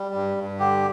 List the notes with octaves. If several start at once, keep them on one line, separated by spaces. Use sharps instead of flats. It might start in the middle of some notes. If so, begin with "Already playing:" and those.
Already playing: G3
G2
G2
D3 G4